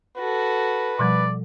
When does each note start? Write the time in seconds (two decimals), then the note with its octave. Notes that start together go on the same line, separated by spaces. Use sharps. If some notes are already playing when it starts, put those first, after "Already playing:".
0.17 F#4 A4 B4
0.99 B2 F3 G3 D5